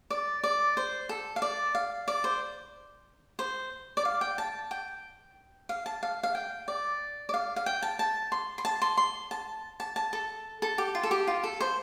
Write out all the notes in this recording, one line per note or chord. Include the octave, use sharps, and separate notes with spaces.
D5
D5
C5
A4
F5
D5
F5
D5
C5
C5
D5
F5
G5
A5
G5
F5
A5
F5
F5
G5
D5
D5
F5
F5
G5
A5
A5
C6
C6
A5
C6
C6
A5
A5
A5
A4
A4
G4
F4
A4
G4
F4
A4
C5